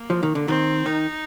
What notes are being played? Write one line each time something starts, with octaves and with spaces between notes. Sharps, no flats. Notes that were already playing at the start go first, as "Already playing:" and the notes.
Already playing: A#3
F3
D#3
D3
D#3 C4
D#3 D#4